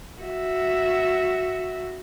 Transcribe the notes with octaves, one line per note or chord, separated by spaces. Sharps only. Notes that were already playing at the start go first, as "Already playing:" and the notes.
F#4 E5